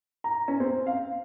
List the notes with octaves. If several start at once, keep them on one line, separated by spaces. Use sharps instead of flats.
A#5
C#4
C4
F5